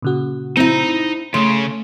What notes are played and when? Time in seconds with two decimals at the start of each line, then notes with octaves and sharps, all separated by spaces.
0.02 A#2 C#3 F#4
0.57 C4 D#4 E4 A#5
1.34 C#3 A3 C6